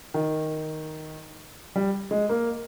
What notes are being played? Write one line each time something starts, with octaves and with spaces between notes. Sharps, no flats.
D#3
G3
G#3
A#3